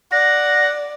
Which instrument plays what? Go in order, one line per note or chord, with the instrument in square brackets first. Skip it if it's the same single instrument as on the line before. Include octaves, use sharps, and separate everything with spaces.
[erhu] D5 [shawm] F#5 [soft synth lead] A#6